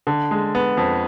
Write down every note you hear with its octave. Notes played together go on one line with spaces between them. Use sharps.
D3
G#3
B3
F2